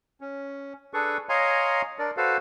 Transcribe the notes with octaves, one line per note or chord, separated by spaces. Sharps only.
C#4
D4 G#4 A4 B4 C#6
C#5 D#5 F5 G#5 A#5 C6
D4 A#4 D5
F#4 A4 B4 C5 F5